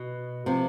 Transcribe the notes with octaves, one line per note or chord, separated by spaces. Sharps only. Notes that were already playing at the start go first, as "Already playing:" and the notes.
Already playing: B2
C3 F3